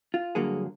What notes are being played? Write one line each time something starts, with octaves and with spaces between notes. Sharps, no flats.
F4
G2 D3 F#3 A#3 G#4